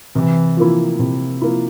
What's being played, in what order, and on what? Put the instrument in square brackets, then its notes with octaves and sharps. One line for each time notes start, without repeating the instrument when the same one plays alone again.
[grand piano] C3 [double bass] E3
[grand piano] F3 A#3 E4
C3
F3 A#3 E4